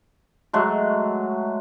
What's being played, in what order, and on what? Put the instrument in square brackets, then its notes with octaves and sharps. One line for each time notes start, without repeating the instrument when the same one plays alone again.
[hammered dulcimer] F#3 G#3 A3